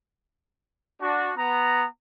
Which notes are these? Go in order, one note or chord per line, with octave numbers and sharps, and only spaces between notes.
D4 F#4
B3 A#5